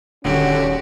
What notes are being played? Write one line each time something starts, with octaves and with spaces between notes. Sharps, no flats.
D#1 D3 C#4 F#4 G4